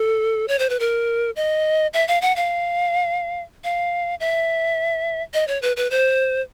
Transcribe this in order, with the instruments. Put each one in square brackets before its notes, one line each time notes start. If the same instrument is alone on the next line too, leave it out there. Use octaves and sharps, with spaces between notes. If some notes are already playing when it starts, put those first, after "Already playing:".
Already playing: [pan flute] A4
C#5
C5
B4
A#4
D#5
E5
F5
F#5
F5
F5
E5
D#5
C#5
B4
B4
C5